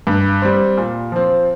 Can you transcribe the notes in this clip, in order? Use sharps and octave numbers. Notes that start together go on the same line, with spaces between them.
G2
G3 C4
A#2
F3 C4